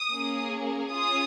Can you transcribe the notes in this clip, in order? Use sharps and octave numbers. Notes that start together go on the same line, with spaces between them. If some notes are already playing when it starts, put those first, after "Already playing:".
Already playing: D#6
A#3 C#4 G#4
C#4 F4 G#4 D#6